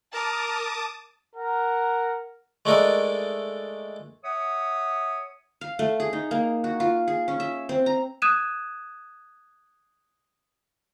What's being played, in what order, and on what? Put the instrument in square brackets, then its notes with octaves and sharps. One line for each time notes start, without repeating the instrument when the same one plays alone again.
[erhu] A#4 [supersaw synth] A5 D6 D#6
[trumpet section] A#4 F#5
[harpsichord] G#3 A3 D4 D#4 A4 A#4
[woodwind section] C#5 E5 F#5 D#6
[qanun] F5
A3
G#4
D#4
A#3
F#4
F4
G#4
C#4
E5
C4
A#5
[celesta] D#6 F#6 G#6 D#7 E7